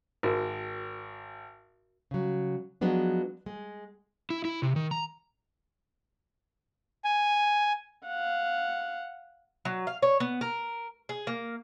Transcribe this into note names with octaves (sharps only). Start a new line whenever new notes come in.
G#1 F#4 A#4
C#3 F#3
F3 F#3 G#3 B3 D4
G#3
E4
E4
C3
D#3
A#5
G#5
F5 F#5
F#3
F5
C#5
B3
A#4
G#4
A#3